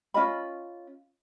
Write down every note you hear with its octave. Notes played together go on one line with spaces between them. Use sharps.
C#4 F4 D#5 B5